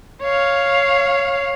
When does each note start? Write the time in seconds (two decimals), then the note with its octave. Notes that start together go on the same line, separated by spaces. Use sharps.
0.23 C#5 F5